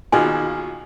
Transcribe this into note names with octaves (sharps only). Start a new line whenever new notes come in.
D#2 B2 F4 G#4 G#5